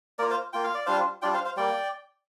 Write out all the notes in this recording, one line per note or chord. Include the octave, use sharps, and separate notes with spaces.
A#3 F4 A#4 D5
C5 F5
A#3 F4 G5
F5
D5
G3 D4 F4 C5 F5
G3 D4 F4 D5 G5
C5 F5
C5 F5
G3 A#3 D5 G5